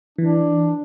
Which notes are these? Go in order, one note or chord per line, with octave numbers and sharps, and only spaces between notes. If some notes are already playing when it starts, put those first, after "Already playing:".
E3 D4